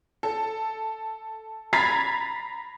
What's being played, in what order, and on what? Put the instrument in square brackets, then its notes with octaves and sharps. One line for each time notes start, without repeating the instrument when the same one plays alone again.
[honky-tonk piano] A4
A#5 B5 G#6 A6 B6 C7